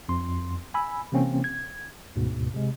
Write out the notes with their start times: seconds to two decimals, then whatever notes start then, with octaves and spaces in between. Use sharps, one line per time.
0.09 F2 C6
0.74 G#5 B5 E6
1.12 C3 E3 A#3 C4 C#4
1.44 G#6
2.16 D2 G#2 B2
2.54 C3 G#3